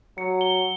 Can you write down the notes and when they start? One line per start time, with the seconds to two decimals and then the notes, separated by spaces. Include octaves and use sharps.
0.18 F#3 C#7
0.41 G7